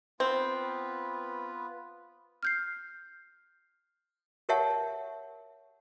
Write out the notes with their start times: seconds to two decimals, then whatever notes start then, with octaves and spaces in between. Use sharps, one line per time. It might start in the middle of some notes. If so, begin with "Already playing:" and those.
0.20 B3 C4 F4 B4
2.43 F6 G6 C7
4.49 G4 A#4 C#5 E5 F#5 A5